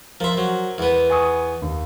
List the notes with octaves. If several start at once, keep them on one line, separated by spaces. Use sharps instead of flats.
F3 A#4 C5 E5 C6
F#3
E2 B3
G#5 C#6 D#6
D#2